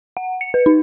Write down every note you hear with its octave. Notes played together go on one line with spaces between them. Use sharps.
F#5
C#7
B4
D#4